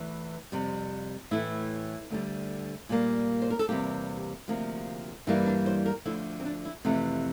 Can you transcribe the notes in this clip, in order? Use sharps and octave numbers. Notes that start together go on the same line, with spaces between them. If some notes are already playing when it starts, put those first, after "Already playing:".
Already playing: E2 E3 A3
F2 C3 G3
A2 E3 A3 E4
D2 D3 G3
A#2 G3 A#3
C5
A#4
A4
E2 C3 G3 A#3 G4
D2 C3 F3 A#3
G2 E3 G3 A#3 E4
D4
C5
A#4
D2 D3 F3 E4
C4
D4
E4
F2 C3 E3 A3